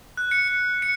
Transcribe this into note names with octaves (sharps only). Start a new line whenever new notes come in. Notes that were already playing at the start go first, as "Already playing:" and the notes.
F#6
C#7
C#7
C#7